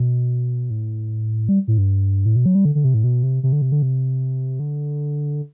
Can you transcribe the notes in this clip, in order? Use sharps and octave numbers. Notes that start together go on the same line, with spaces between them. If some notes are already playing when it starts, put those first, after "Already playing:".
Already playing: B2
A2
G3
A2
G2
A2
B2
F#3
G3
D3
D3
C3
A2
B2
C3
C3
D3
C3
D3
C3
D3